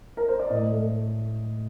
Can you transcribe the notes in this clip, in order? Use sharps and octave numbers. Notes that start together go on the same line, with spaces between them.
A#4
C5
D5
A2 D#5
A3